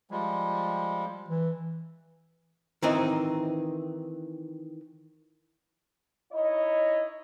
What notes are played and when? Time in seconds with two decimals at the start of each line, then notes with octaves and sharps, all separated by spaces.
0.11 F3 G3 G#3
1.29 E3
2.82 D#3 E3 C4 D#4
6.32 D#4 E4 C#5 D#5